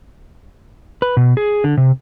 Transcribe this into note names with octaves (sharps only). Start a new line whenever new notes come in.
B4
B2
G#4
D3
C3